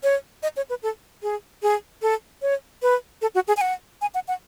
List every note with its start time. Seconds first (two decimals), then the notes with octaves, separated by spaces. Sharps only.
0.03 C#5
0.43 D#5
0.57 C#5
0.70 B4
0.83 A4
1.23 G#4
1.63 G#4
2.02 A4
2.42 C#5
2.82 B4
3.22 A4
3.35 F#4
3.48 G#4
3.57 G#5
3.61 F#5
4.01 G#5
4.15 F#5
4.28 F#5